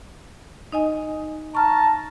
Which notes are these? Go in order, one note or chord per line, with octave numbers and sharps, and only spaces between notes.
D#4 D#5 G#5
A5 A#5 C#6 F6